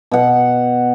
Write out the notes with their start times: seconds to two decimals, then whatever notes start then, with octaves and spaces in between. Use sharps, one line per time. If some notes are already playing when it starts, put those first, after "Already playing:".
0.11 B2 F#5